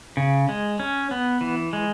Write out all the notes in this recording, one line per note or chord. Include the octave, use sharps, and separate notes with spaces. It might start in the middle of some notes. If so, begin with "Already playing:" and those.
C#3
G#3
C#4
B3
E3
G#3